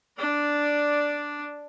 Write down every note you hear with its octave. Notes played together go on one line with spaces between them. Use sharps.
D4 D5